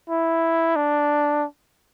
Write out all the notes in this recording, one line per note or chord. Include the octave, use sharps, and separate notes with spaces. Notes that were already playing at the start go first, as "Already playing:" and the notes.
E4
D4